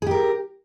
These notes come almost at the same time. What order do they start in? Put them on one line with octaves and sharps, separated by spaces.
G#4 G4 A#4